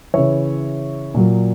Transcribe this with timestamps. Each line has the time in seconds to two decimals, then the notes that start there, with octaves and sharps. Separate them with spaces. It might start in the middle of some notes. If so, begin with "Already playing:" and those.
0.14 C#3 E3 C#5 E5
1.14 A#2 F#3